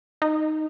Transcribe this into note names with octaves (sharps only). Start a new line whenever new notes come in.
D#4